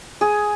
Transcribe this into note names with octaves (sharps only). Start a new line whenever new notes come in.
G#4